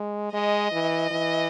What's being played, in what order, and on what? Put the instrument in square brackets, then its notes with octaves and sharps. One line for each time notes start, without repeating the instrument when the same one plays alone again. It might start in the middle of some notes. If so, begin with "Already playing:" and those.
Already playing: [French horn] G#3
[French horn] G#3 [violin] D#5
[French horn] E3
E3